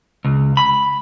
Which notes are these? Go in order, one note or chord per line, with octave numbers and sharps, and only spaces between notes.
C#2
B5